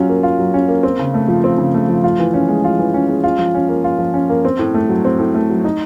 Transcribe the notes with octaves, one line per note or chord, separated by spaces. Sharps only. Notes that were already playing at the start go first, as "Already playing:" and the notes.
Already playing: F#3 C#4 F4
A#3
F4
F#3
C#4
A#3
C4
C#3
A3
F3
C4
C#3
A3
F3
F4
E3
C#4
G#3
F4
E3
C#4
G#3
F4
F3
C#4
A#3
F4
F3
C#4
A#3
C4
A2
A3
F#3
C4
A2
A3
F#3
D#4